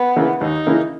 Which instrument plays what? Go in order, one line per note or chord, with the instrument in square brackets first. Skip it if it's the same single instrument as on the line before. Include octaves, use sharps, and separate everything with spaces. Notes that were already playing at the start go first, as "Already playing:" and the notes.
Already playing: [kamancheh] B3
[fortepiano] C#3 E3 A#3 E4
[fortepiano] D#2 [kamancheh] D#4
[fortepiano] C#3 E3 A#3 E4